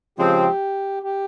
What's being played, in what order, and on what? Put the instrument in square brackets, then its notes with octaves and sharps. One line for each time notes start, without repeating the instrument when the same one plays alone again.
[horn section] C#3 F3 G#3 C4 [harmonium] G4
[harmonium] G4